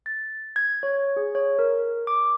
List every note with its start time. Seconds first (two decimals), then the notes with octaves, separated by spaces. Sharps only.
0.06 A6
0.56 G#6
0.83 C#5
1.17 G#4
1.35 C#5
1.59 A#4
2.07 D6